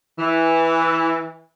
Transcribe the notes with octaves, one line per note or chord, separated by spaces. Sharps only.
E3